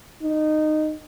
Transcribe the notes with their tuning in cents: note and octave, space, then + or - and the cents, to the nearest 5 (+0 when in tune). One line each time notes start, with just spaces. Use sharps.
D#4 -15